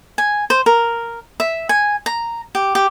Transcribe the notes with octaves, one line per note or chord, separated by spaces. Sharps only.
G#5
C5
A#4
E5
G#5
A#5
G4
G4